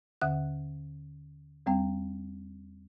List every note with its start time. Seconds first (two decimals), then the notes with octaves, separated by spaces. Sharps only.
0.21 D#2 D3 E5 F#5 F#6
1.66 E2 G3 C4 G5